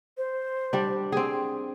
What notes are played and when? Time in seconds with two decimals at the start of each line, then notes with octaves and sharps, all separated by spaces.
0.18 C5
0.73 G3 D4
1.12 C4 G#4 G5